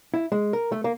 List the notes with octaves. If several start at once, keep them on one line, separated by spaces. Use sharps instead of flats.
E4
G#3
A#4
A3
A#3